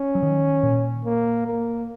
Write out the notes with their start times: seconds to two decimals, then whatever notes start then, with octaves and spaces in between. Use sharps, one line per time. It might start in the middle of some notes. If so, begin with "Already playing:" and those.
Already playing: C#4
0.15 F#3
0.23 D#3
0.63 A#2
1.05 A#3
1.47 A#3